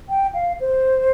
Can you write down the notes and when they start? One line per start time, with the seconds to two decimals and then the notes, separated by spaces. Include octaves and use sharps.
0.09 G5
0.34 F5
0.60 C5